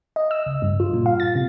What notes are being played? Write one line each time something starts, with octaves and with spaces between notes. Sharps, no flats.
D#5
E6
C#2
G2
F4
A#2
F5
A6
C3